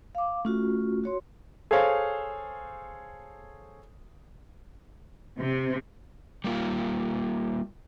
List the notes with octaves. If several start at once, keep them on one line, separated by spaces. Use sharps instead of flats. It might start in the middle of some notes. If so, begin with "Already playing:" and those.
F5 D6
A3 C#4 F4 F#4
F#4 C#5 C6
G#4 A4 C5 C#5 F5
C3
G3 A#3 F4